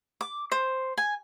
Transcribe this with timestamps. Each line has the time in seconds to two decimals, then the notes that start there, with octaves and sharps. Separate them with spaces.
0.21 D6
0.52 C5
0.97 G#5